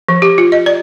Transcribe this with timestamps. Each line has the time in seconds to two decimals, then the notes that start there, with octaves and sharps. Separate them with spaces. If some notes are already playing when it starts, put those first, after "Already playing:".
0.08 F3
0.22 G4
0.38 F4
0.52 D#5
0.66 D5